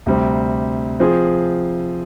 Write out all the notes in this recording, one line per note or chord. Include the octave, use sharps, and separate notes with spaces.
D2 C3 G3 C4
F3 C4 F4 G#4